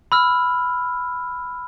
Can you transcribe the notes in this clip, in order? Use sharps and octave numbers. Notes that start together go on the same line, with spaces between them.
B5 E6 F6